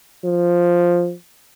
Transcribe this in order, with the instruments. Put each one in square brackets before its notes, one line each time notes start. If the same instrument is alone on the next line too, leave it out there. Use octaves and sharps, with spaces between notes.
[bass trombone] F3